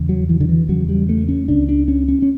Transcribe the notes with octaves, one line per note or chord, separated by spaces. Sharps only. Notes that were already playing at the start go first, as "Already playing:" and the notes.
Already playing: E2 C#3
F#3
E3
D3
E3
E2 C#3 F#3
G3
A3
C#4
C#2 C#3 D4
D4
C#4
C#4
C#4